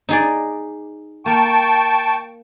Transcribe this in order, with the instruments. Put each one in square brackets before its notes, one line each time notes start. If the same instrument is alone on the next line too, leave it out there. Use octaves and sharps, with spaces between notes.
[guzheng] D#4 G#4 D5
[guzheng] A#3 [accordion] G5 A5 C#6